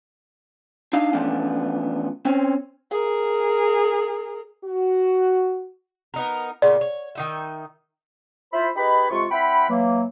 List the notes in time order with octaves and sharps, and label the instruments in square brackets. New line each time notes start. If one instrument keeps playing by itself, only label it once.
[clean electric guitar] D4 D#4 F5
E3 F3 A3 B3 C#4 D4
C4 C#4 C5
[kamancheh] G#4 A#4
[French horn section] F#4
[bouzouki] B3 D#4 A#4
[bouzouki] A#2 C#3 B3 [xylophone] D5
[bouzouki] C#5
D#3 D#4 E5
[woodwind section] E4 F4 C5 B5
D#4 G4 G#4 B4 D#5 B5
F2 C3 G#3 F4 C#6
C4 E4 F#5 G5 B5
E3 F#3 A#3